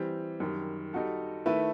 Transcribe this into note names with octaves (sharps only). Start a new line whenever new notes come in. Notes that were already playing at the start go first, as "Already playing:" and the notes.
Already playing: E3 G3 C4
F#2 D#3 G3
G3 D#4 F#4 A4
D#3 A3 E4 B4